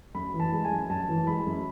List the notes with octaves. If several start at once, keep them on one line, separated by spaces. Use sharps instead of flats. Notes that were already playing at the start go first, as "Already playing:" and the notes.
F#2 B5
E3
A5
G#3
G#5
F#2
F#2 A5
E3
G#3 B5
F#2